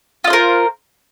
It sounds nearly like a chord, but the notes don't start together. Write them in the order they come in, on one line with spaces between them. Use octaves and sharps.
F4 D#5 C5 A#4